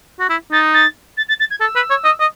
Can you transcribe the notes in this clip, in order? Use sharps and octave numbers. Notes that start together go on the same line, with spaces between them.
F#4
E4
D#4 A6
A6
A6
A6
A6
G#6
A4 E6
B4
C#5
D#5
D#5